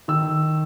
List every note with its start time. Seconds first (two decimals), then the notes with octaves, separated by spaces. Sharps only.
0.08 D#3 E6